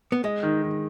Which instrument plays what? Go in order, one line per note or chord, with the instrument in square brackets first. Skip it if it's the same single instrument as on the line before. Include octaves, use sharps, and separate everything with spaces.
[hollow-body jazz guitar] B3
[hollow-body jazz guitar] G#3 [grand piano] D#5
[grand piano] D#3
D#3